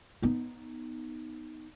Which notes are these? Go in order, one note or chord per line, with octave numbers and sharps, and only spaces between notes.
B3 D#4